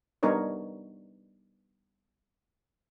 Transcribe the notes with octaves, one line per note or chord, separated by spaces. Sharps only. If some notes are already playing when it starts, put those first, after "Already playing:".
G3 B3 D4 D#4 A#4 C#5